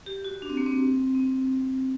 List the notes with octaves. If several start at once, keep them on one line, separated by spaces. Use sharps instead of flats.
G4
F#4
D4
C4
A#3
C4
C4